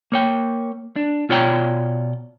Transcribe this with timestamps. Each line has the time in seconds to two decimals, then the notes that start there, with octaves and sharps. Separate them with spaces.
0.12 A#3 C#5 G5
0.96 D4
1.29 B2 F4 C#5 D5 G5 A#5